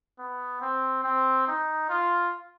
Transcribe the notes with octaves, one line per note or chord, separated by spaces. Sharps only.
B3
C4
C4
D#4
F4